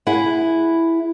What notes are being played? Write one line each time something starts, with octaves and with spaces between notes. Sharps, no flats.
E4 G#4 F#5